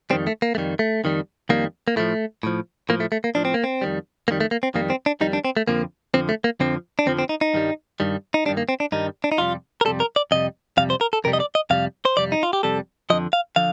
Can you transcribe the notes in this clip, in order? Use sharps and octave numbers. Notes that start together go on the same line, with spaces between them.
F2 D#3 G3 C4
A3
A#3
F2 D#3 G3 A3
A3
F2 D#3 G3
F2 D#3 G3 A#3
A#3
A2 F3 A3
A2 F3
A2 F3 A#3
A3
A3
A#3
A2 F3 D4
C4
A#3
C4
F2 D#3 G3
F2 D#3 G3 A#3
A3
A#3
C4
F2 D#3 G3 A#3
C4
D4
F2 D#3 G3 D#4
D4
C4
A3
F2 D3 F3 A#3
F2 D3 F3 C4
A3
A#3
F2 D3 F3 C4
D4
F2 D3 F3 C4
C4
D#4
D#4
G2 D#3 G3
G2 D#3 G3
D#4
G2 D#3 G3 D4
A#3
C4
D4
G2 D#3 G3 D#4
D4
D#4
F2 C3 G3 F4
A#4
F2 C3 G3 A4
A#4
D5
F2 C3 G3 D#5
F2 C3 G3 F5
C5
A#4
A4
F2 C3 G3 A#4
D#5
D5
D#5
F2 C3 G3 F5
C5
F2 C3 G3 D5
D#4
F4
G4
F2 C3 G3 A4
F2 D3 F3 D#5
F5
D3 F3 F5